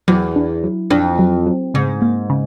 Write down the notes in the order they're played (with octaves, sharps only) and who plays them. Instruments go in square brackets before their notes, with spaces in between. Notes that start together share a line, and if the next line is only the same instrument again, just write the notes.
[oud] E2 [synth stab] F#3
[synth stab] D4
F#3
[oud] F2 [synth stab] D4
[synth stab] F#3
F#3
[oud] G#2 [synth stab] C#3
[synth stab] A#3
C#3